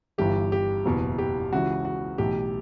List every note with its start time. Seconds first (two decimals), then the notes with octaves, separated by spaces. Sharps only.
0.18 G1 G2 E3 G4
0.52 G4
0.85 F#1 E2 B2
1.18 G4
1.52 C#2 C#3 E3 F#4
1.85 F#4
2.18 B1 A2 E3 G4